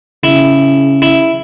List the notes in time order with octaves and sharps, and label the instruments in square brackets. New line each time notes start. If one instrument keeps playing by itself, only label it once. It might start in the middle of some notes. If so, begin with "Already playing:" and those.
[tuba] C#3 [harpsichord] E4
[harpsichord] E4